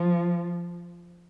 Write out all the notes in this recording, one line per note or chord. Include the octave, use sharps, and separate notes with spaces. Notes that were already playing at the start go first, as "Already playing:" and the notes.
Already playing: F3